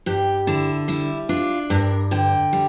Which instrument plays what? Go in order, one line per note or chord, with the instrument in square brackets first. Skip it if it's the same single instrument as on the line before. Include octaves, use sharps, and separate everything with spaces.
[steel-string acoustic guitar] G2 G4
D3 E4
G3 E4
D4 F4
G2 A#4
D3 G5
G3